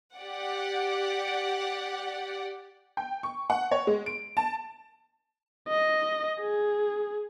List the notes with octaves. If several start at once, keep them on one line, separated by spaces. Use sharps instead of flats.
G4 D5 F#5
G5
C#6
F#5
C#5
G#3
D7
A5
D#5
G#4